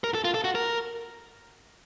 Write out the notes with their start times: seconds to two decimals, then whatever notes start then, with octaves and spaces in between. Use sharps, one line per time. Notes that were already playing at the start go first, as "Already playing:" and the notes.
0.04 A#4
0.15 A4
0.25 F4
0.34 A4
0.44 F#4
0.55 A#4